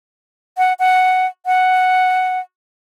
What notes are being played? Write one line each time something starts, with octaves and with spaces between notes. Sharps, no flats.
F#5
F#5
F#5